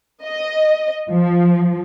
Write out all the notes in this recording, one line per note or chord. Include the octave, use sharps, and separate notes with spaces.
D#5
F3